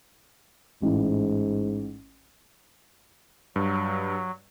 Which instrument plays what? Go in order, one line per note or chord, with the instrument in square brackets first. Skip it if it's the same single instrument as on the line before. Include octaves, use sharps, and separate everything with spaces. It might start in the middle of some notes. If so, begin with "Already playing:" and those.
[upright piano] A1 E4 [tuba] G#2
[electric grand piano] G2 [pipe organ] F#3